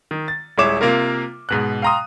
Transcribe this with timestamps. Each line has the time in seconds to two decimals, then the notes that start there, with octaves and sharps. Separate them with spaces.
0.11 D#3
0.28 A6
0.58 D#1 G#3 E4 C#5 D6 E7
0.81 C3 A#3 F4 A#4
1.49 G#2 B2 F#6
1.82 F5 G5 A#5 C6 D#6